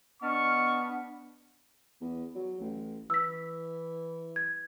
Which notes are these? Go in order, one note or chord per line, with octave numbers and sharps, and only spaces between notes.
B3 D4 D#5 A5 C#6 F6
E2
F#3
A1
E3 E6 B6
G#6